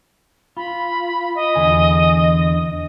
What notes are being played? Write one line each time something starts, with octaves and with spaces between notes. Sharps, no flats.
F4 B5
D#5
E2 D3 G#5